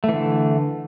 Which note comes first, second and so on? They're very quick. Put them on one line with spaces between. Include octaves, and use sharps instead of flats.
A3 E3 D3